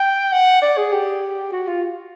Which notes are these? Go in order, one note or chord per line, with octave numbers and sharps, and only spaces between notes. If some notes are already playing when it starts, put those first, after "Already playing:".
Already playing: G5
F#5
D5
G#4
G4
F#4
F4